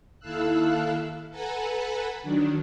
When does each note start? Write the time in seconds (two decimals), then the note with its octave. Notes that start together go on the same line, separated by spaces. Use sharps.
0.19 D#2 E4 A4 F5 E6 F#6
1.30 A4 B4 F#5 G#5 A#5 B5
2.22 D#3 F#3 D4